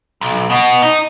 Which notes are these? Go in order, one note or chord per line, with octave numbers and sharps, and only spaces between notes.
B1
B2
D#4